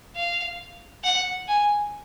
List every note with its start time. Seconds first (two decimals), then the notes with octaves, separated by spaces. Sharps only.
0.15 F5
1.04 F#5
1.48 G#5